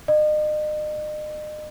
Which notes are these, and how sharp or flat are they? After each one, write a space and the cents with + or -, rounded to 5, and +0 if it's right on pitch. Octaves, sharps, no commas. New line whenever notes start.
D#5 -40